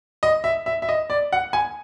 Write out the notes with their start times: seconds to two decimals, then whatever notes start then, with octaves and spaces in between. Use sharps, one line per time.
0.23 D#5
0.44 E5
0.66 E5
0.82 E5
0.89 D#5
1.10 D5
1.33 F#5
1.53 G#5